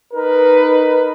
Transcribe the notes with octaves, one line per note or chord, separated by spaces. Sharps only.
D#4 A#4 B4